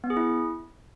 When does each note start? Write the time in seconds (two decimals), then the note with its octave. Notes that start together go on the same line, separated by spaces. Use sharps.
0.04 B3
0.10 G#4
0.17 E4